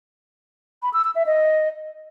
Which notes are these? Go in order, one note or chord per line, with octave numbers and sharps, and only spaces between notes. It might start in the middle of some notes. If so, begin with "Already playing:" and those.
B5
E6
E6
E5
D#5